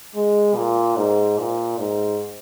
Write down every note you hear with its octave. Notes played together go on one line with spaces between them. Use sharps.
G#3
A#2
G#2
A#2
G#2